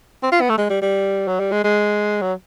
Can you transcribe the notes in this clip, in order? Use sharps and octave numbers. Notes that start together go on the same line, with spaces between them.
C4
F4
B3
A3
G#3
G3
G3
F#3
G3
G#3
G#3
F#3